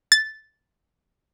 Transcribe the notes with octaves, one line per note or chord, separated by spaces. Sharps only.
A6